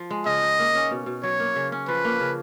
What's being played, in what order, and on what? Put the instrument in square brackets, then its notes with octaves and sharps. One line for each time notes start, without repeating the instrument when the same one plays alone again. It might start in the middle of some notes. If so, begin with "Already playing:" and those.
Already playing: [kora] F3
G#3
[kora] C#3 [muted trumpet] D#5
[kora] D#4
A#3
C#4
B2
B2
[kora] F#3 [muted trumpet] C#5
[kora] A#3
C#3
C#4
[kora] F3 [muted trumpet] B4
[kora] A#3
C#3